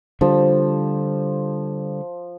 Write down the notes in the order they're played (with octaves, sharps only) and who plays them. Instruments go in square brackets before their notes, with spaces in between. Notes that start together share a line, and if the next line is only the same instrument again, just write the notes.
[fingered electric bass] D3 G3 [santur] F3